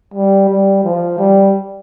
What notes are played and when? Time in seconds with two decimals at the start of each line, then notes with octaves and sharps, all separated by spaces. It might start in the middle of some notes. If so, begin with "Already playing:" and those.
0.14 G3
0.49 G3
0.84 F3
1.18 G3